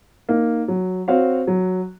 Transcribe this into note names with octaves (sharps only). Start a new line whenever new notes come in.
A#3 D#4
F#3
C4 F#4 C#5 F5
F#3